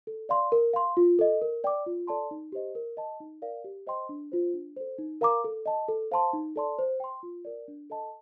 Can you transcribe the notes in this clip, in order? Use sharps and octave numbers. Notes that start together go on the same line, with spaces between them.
A4
D5 F5 C6
A#4
F5 C6
F4
A4 D#5
A#4
D5 G5 D6
F4
A4 D5 A5 C6
D#4
G4 C5 D#5
A#4
D#5 A5
D#4
A#4 D5 F5
G4
C5 D#5 G5 C6
D4
F4 C5
D4
A4 C5
D#4
A#4 F5 A#5 D6
A4
D#5 A5
A4
C5 F5 A5 C6
D#4
A4 D5 A5 C6
C5
G5 C6
F4
A#4 D5
D4
A4 D#5 A5